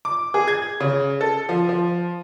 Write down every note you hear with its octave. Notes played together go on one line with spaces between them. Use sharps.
D6
G#4
G#6
C#3
A4
F3
F3